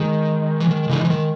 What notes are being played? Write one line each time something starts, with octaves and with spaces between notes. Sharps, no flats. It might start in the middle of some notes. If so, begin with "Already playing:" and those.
Already playing: D#3 G#3
E3
D#3
C#3 E3
E3
D#3